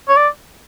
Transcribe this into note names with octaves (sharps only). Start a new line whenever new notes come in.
C#5
D5